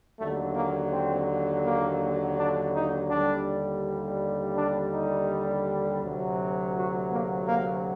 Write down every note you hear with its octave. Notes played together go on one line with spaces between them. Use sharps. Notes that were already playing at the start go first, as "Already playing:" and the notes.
D#2 D3 F#3 A3
A#3
C4
A#3
D4
D#4
D#2 D3 G3 D4
D4
D#4
D2 C3 F#3
F#4
A#3
A#3